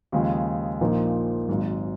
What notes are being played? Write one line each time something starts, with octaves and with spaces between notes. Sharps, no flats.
D#2 C#3 F3 G#3
A#1 A#2 F3 A#3 D#4
G#1 G#2 F#3